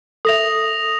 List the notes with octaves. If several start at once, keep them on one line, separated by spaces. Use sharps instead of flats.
A4 E5 D#6 A#6 F7